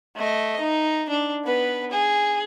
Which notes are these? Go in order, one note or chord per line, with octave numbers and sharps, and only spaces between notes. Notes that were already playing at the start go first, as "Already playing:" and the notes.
A3 D#5
D#4
D4
B3 B4
G#4